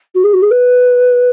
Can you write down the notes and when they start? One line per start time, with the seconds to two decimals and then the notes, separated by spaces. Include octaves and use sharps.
0.15 F#4
0.24 G#4
0.33 F#4
0.42 G#4
0.51 B4